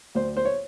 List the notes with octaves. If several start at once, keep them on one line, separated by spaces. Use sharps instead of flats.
D2 C5
C5
C#5